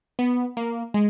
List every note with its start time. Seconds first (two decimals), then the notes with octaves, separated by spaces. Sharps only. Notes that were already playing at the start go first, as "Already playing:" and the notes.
0.19 B3
0.57 A#3
0.94 G#3